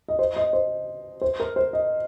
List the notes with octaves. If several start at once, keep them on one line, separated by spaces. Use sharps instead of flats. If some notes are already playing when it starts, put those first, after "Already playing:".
D#5
C5
D#5
C5
C5
A#4
C5
D#5